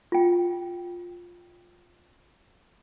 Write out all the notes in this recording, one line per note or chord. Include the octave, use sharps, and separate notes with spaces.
F4 G5